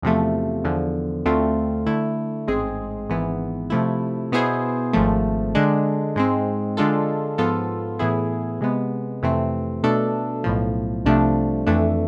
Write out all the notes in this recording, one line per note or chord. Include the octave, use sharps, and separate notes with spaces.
E2 C3 F3 A3
E2 D3 F3
D2 D3 A3 C4 F4
D3 A3 E4
A1 G#2 G#3 C4 G#4
G#1 G#2 E3 B3
C3 F3 A3 E4
B2 B3 E4 G#4 C5
G#1 G#2 F3 A3
D3 G#3 D4
G#2 G#3 C4
D3 G#3 D4 F4 A4
G#2 F3 B3 F4 A4
A2 E3 B3 E4 G#4
C3 G#3 B3
F2 C3 E3 A3 C4
B2 A3 D4 A4
B1 A2 F3
C2 C3 F3 A3 D4
F2 E3 A3 D4